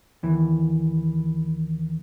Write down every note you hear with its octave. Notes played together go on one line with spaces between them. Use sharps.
D#2 E3